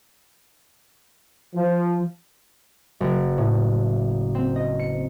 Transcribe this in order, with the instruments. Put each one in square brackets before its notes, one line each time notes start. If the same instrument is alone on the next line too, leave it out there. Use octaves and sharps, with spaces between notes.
[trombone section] F3
[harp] F#1
A2
C4
D#5
C#7